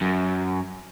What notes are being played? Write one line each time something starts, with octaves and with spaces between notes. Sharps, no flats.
F#2